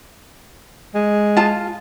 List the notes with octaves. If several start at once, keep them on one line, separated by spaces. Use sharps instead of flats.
G#3
F4 A5